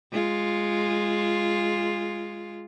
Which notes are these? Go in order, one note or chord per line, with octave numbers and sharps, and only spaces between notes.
G#3 F4